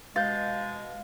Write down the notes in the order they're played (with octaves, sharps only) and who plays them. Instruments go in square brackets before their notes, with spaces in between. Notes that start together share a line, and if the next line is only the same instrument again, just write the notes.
[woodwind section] B2 G#3 [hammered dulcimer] F5 [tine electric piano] G6 A6